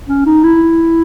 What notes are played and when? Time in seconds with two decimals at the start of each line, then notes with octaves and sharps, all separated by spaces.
0.08 C#4
0.26 D#4
0.44 E4